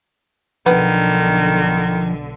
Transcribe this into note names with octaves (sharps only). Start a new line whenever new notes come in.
B1 D3 D#3 F3 B3